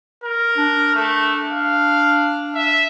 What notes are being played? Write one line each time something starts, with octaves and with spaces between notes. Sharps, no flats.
A#4
D4
A3
F5
E5